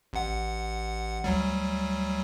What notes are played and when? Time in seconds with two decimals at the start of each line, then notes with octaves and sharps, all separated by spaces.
0.13 A1 F#5
1.24 D2 F#3 G3